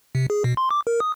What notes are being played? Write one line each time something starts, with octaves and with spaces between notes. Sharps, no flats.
C3
G#4
B2
C6
D6
A#4
D#6